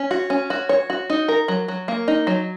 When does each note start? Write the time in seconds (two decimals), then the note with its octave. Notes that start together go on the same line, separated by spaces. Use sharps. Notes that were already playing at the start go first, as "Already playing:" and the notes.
Already playing: C#4
0.11 F#4
0.30 C#4
0.50 F#4
0.69 C#5
0.90 F#4
1.10 D#4
1.28 A#4
1.48 F#3
1.68 F#3
1.88 A#3
2.08 D#4
2.27 F#3